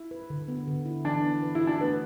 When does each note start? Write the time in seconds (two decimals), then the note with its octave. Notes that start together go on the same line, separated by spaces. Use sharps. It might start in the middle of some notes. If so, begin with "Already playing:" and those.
Already playing: E4
0.11 B4
0.30 D3
0.48 B3
0.67 D3
0.86 E4
1.05 E3 D4
1.24 B3
1.42 B4
1.55 E4
1.62 F#4
1.67 D4
1.80 A3 B3